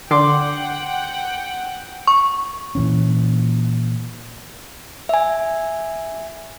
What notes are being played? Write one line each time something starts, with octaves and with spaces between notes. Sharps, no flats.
D3 F#5 G5 C6 D6
C#6
A#2 E3 C#4
E5 G#5